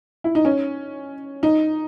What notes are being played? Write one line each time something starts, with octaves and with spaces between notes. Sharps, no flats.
E4
D#4
C#4
D#4